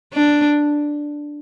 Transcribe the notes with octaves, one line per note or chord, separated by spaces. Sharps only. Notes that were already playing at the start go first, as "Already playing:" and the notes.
D4